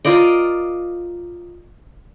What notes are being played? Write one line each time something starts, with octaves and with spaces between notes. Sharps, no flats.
F4 A#4 D5 D#5